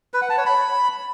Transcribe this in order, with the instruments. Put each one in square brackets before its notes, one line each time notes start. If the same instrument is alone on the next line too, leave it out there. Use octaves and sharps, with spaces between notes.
[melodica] B4
F#5
A5
C#5
B5